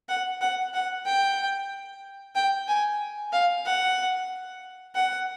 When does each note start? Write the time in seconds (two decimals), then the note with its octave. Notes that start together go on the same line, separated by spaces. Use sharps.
0.09 F#5
0.41 F#5
0.74 F#5
1.06 G5
2.35 G5
2.68 G#5
3.33 F5
3.65 F#5
4.95 F#5